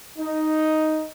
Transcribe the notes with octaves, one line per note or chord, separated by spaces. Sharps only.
D#4